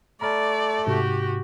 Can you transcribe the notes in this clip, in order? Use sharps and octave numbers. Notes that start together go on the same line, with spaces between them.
A3 D5 A#5 B5 F6
G#2 C3 F#4 G4